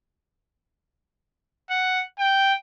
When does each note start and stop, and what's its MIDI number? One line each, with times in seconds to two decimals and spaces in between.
1.70 2.04 78
2.19 2.54 79